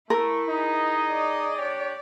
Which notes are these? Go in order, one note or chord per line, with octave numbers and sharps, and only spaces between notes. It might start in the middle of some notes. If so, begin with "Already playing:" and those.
A3 E4 A#4
D#4 G#4 D#5
D5
D4 G4 C#5